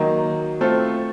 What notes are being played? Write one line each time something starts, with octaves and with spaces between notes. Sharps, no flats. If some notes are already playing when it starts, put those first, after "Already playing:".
Already playing: D#3 F#3 A#3 D#4
A3 C4 F4 A4 C5